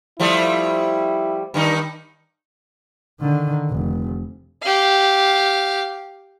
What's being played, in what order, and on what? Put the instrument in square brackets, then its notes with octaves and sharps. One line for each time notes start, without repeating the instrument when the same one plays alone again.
[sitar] F3 G3 A3 [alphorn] E4
[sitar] G2 D#3 D#4
[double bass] D3 D#3
F1
[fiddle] G4 F5